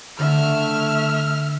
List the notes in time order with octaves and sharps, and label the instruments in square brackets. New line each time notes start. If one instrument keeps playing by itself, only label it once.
[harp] D3 [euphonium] A3 [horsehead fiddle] E5 [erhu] F6